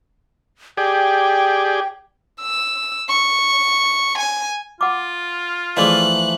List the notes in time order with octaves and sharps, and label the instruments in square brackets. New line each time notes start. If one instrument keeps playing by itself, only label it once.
[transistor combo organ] G4 G#4 D5 [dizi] G5
[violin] E6
C#6
G#5
[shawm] F4 [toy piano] F#5 D6
[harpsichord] E3 F3 A3 [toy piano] G#4 D5 F5 [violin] F#6